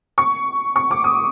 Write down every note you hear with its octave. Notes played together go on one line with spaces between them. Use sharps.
C#6
C#6
D6
D#6